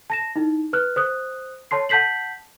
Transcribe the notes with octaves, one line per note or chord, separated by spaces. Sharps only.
A5 A#6 E7
D#4 E4
B4 F6 F#6
C5 D#6 F#6
C#5 A5 C6 C7
F#5 A5 G6 B6 C7 F#7